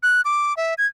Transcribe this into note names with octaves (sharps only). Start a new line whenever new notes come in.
F#6
D6
E5
G#6